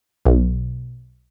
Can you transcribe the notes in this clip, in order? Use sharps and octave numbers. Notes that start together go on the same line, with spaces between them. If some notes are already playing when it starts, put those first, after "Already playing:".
B1